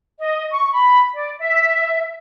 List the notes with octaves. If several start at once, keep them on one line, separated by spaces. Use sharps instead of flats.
D#5
C#6
B5
D5
E5